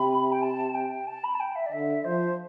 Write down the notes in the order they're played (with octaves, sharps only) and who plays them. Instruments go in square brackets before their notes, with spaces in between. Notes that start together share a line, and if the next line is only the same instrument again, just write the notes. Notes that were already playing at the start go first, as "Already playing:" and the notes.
Already playing: [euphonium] C3 [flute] B5
[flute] G5
A5
G5
A5
B5
A5
G5
E5
D5
[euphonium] D3 [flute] E5
[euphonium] F3 [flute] C5